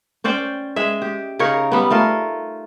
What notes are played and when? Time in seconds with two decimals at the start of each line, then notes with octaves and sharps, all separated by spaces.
0.24 C#4 C5 D5 G5
0.76 G#3 G#4 E5
1.02 G4
1.39 C#3 D#4 A#4 C#5
1.72 G3 B3
1.90 A3 F4 A#4